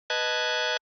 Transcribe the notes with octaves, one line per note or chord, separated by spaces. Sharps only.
B4 D#5 A5 F#6 G#6